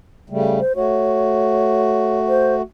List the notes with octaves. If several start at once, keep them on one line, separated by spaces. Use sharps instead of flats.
C#3 G3 A3
C5
A3 F#4 C#5
C5